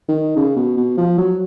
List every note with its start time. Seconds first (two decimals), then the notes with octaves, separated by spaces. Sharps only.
0.08 D#3
0.36 C#3
0.56 B2
0.77 B2
0.97 F3
1.18 F#3